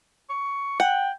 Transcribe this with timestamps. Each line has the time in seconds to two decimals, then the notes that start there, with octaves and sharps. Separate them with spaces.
0.30 C#6
0.80 F#5 G5